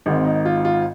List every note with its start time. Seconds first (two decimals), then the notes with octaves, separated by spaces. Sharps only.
0.06 G#1 G#2 D#3 C4
0.25 D#4
0.45 F4
0.65 F4